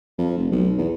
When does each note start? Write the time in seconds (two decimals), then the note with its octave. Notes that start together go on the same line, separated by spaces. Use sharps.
0.18 F2
0.38 F1
0.52 B1
0.78 E2